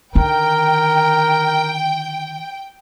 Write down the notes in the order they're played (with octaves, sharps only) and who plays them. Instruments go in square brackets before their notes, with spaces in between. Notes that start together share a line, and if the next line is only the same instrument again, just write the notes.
[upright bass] D3 D#3 [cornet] A#4 [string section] G5